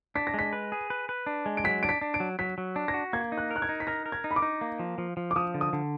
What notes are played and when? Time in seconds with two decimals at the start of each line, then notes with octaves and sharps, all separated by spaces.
0.15 D4 B6
0.27 A#6
0.34 G#3 B6
0.53 B4
0.72 G#4
0.90 B4
1.09 B4
1.27 D4
1.46 G#3
1.57 D7
1.64 F#3 B6
1.83 D4 D7
1.89 B6
2.01 D4
2.14 D7
2.20 F#3
2.39 F#3 B6
2.58 F#3
2.76 D4
2.88 A#6
2.94 F#4
3.13 A#3 G#6
3.32 D#4
3.38 F#6
3.51 A#4
3.56 F#6
3.62 G#6
3.69 D#4
3.80 B6
3.87 A#4 A#6
4.06 A#4
4.12 G#6
4.24 D#4
4.31 B5
4.36 D6
4.42 D#4
4.61 A#3
4.79 F3
4.98 F3
5.17 F3
5.31 D6
5.36 F3 D#6
5.54 D3
5.61 D#6
5.73 D3